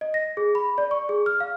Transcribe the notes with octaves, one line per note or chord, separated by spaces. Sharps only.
D#5
A#6
G#4
B5
D5
C#6
G#4
F6
F5